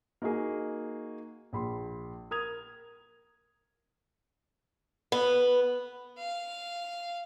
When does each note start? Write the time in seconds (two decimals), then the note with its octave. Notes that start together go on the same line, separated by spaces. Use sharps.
0.22 A#3 D#4 F#4 G#4
1.53 A#1 B5 C6
2.31 A#4 D#6 G#6 F7
5.12 B3
6.19 F5